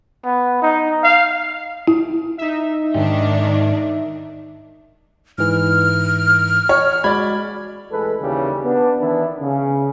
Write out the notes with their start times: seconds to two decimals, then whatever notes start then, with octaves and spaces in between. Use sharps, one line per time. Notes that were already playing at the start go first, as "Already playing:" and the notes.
0.24 B3
0.62 D#4
1.04 F5
1.88 E4
2.38 D#4 E5
2.94 G#2 D#3 D4 G4
5.38 G#2 E3 F6
6.69 C#5
7.04 G#3 F#4 D5 B5 G#6
7.91 A1 E3 G#3 A4 B4
8.20 D#2 C#3 E3 G3
8.64 B3 D4
8.98 D#3 E3 B3 D4 E4
9.41 C#3